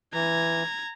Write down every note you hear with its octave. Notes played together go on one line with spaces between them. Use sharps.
E3 A#5 G#6